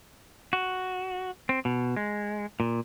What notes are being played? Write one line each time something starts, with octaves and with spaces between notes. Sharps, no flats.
F#4
C4
B2
G#3
A#2